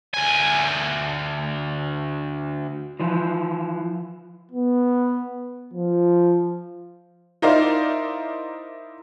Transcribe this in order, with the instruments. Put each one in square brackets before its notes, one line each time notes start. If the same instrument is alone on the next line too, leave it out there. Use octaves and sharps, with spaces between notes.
[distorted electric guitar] D2 G#5
[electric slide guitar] E3 F3
[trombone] B3
F3
[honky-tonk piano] D#4 E4 A#4 C5 D5 F5